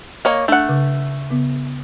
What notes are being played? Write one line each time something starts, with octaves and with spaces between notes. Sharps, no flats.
A#3 C#5 D#5
A3 D4 F#5
C#3
C#3 B3